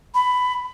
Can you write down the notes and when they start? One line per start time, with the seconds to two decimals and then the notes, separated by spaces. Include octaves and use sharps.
0.15 B5